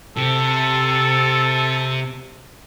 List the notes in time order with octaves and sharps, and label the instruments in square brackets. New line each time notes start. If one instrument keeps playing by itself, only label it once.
[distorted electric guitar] C3 [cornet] A4